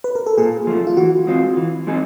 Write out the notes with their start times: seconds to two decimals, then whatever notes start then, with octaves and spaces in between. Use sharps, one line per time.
0.04 B4
0.15 A#4
0.26 A4
0.38 A#2 G#4
0.67 F3 A3
0.87 F4
0.97 E3 F#4
1.27 G#3 C4 F4
1.57 E3
1.87 G#3 C4 D#4 G#4